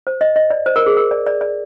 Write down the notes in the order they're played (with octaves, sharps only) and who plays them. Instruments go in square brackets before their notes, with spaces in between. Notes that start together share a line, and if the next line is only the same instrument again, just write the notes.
[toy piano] C5
D#5
D#5
D5
C5
A#4
G#4
A#4
D5
D5
D5